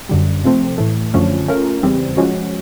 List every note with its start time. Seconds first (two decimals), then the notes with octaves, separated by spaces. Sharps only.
0.09 F#2 D3 G3
0.44 C3 F3 A3 C4
0.78 A2 E3 A3
1.14 F#2 D3 F3 A3 C#4
1.48 A3 C#4 F4 A#4
1.83 E2 C#3 E3 G3 C4
2.17 F3 G#3 C#4 F#4